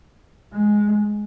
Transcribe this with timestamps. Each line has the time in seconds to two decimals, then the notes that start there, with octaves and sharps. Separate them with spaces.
0.53 G#3